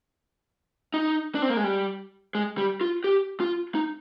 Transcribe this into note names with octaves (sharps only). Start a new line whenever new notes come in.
D#4
D4
C4
A#3
G#3
G3
G#3
G3
F4
G4
F4
D#4